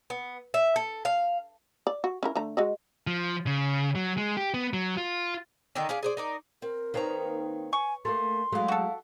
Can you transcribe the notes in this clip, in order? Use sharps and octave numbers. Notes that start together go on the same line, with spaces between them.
B3
E5
A4
F5
D5
F#4
C#4 E4 A#4
D3 A3 A#5
G#3 F#4 D#5
F3
C#3
F#3
G#3
G4
B3
F#3
F4
D3 D#3 D#5 G5
C#4 D4 G#4 F5
G#4 C5 D5
D#4 A#4 D5
C4 A#4
D#3 A#3 C4 B4 C#5 A#5
G#5 C#6
A3 A#3 C6
F#3 G#3 A3 E4 F5
F#4 A4